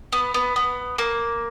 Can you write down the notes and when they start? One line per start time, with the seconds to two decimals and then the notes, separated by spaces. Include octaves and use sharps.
0.13 B3
0.34 B3
0.56 B3
0.98 A#3